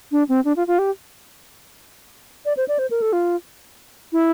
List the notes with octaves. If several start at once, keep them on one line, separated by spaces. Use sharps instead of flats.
D4
C4
D4
F4
F4
G4
D5
C5
D5
C5
A#4
A4
F4
E4